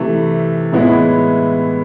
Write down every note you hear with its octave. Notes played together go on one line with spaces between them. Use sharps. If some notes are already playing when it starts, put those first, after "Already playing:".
Already playing: C3 E3 A3
A2 E3 G#3 B3 E4